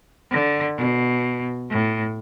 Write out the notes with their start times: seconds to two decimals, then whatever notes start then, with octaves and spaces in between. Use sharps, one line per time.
0.30 D3
0.77 B2
1.69 A2